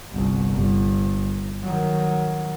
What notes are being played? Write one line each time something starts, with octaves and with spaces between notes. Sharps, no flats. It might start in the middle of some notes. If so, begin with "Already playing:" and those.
G1 C2
G1
D#3 F#3